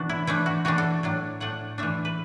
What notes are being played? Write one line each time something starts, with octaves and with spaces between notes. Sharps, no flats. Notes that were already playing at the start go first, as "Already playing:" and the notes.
Already playing: B2 E3 B3 D4 F#4
E4
E3 A3 D4 E4
F#4
E3 A3 D4 F#4
A4
A2 F#3 D4
A2 A3 D4 F#5
E3 A3 D4 E5
B4